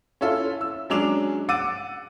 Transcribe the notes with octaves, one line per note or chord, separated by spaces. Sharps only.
C#4 E4 F4 A4
E6
F#3 G#3 C#4 D4 D6 F7
F#5 D6 E6 A6 D#7